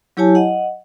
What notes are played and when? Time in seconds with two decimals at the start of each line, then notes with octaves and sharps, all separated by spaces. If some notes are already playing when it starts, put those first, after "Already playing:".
0.17 F#3 E4 G4 C#5 G#5 A5
0.35 D#5 F#5